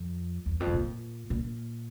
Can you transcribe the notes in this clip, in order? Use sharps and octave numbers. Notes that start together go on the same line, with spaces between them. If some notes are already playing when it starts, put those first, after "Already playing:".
Already playing: F2
E2
F2
A2
A#2
A#2